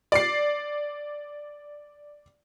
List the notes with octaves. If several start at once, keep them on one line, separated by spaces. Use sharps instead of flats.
D5 C7